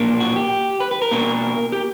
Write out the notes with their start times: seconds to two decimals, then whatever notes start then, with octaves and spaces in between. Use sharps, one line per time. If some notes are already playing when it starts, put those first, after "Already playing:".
Already playing: B1 A#2 A#3 D4
0.20 F#4
0.36 G4
0.80 B4
0.91 B4
1.02 A#4
1.11 B2 A#3 D4
1.72 G4